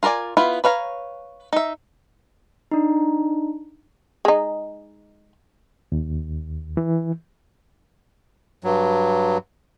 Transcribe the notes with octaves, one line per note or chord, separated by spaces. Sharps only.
F4 A#4 B4 D5 G#5
B3 E4 F4
B4 C#5 F5 A#5
D#4 E5
D4 D#4
G#3 D#4
D#2
E3
G2 F#3